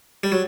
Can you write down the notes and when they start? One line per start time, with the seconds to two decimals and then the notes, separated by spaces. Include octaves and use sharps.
0.23 G3
0.32 F#3